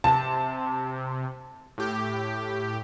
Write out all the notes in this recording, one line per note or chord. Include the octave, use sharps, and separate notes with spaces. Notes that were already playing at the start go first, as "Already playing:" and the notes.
C3 A5
A2 G4